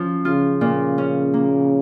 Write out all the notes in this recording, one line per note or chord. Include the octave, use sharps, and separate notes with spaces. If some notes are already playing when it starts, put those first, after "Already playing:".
Already playing: F3 C#4
C#3 F4
A#2
C#4
A#3